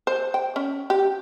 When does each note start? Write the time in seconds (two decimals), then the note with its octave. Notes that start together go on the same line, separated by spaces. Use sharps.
0.07 C5
0.34 G5
0.56 C#4
0.90 G4